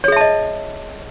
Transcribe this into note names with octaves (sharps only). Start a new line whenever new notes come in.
G#4 C#5 D#5 E5 A5